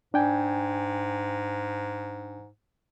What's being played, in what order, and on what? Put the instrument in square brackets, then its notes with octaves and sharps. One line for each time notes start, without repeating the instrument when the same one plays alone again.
[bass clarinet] G#2 [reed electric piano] D4 G5 G#5